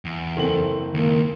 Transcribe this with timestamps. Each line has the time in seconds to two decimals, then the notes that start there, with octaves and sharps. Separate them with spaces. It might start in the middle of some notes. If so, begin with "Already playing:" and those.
0.05 E2
0.37 F#1 C4 A4 F#7
0.94 C#2 D#3 A#3